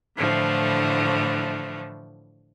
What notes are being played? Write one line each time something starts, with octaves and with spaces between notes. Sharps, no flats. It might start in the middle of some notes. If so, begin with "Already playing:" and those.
A2 D3 E3 F3 A3